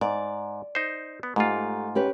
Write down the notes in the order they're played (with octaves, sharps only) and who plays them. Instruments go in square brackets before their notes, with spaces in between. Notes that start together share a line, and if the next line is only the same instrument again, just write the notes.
[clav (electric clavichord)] G#2 [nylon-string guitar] D5
[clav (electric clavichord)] D#4 C5
B3
[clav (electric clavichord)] G#2 F4 [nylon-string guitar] A3 G4
[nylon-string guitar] C#4 G4 B4